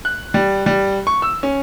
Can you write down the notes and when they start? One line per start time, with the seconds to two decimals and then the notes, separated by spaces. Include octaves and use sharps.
0.05 F#6
0.34 G3
0.66 G3
1.07 C#6
1.22 E6
1.43 C#4